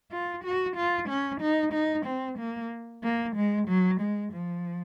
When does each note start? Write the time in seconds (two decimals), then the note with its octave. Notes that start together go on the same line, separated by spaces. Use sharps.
0.12 F4
0.44 F#4
0.76 F4
1.09 C#4
1.41 D#4
1.73 D#4
2.06 C4
2.38 A#3
3.03 A#3
3.36 G#3
3.68 F#3
4.00 G#3
4.33 F3